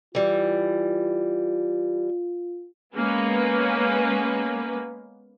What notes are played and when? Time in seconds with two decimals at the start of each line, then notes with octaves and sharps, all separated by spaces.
0.15 E3 G3 F4
2.96 G#3 A#3 B3 C#4 B4